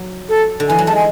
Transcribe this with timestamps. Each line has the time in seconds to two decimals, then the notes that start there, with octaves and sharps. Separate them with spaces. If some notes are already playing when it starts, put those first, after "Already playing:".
Already playing: F#3
0.29 A4
0.60 D3
0.68 E3 G#5
0.79 F#3
0.87 G#3 A5
0.96 G#5